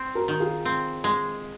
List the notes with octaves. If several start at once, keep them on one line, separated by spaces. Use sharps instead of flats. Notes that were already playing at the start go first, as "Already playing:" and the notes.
Already playing: C4
F#4 A#4
D#3
F4 G#4
C4
G#3